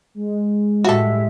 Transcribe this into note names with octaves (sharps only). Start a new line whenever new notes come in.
G#3
A2 G#3 F#4 G4 A4 E5